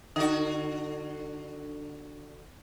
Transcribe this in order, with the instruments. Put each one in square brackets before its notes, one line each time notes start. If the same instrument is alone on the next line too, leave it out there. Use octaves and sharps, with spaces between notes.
[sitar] D3 F#4 [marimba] D#4